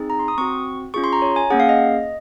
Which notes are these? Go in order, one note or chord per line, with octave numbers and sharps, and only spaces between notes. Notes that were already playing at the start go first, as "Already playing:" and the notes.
Already playing: C4 D#4 G#4
A#5
C6
D#6
C4 F#4 C#6
C#4 F4 G#4 C#6
C6
A#5
C#5
G#5
A#3 C#4 G#4 F#5
F5
D#5